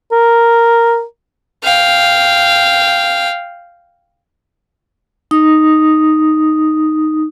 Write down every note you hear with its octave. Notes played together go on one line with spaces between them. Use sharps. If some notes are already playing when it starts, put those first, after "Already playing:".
A#4
F5 G5
D#4 D#6